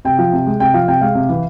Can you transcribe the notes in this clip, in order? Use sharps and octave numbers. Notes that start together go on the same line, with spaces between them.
C3 G5
F3
C3
G#3
C3 G5
F3 F5
C3 G5
G#3 F5
C3
E3